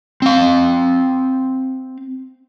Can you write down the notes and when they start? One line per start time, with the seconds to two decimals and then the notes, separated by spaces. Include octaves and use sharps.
0.22 C4 F5